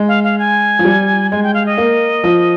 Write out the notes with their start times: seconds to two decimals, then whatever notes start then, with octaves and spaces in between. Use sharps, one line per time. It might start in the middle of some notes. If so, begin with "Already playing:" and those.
Already playing: G#3
0.08 F5
0.24 F5
0.39 G#5
0.79 F3
0.85 G3
1.31 G#3 G#5
1.43 G5
1.54 F5
1.66 D#5
1.77 A#3
2.24 F3